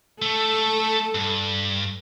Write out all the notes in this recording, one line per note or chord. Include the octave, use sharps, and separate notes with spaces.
A3 A4
G2